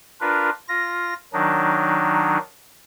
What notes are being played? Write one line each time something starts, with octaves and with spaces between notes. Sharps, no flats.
D4 F4 A#4 B4
F4 A#6
D#3 F#3 D4 D#4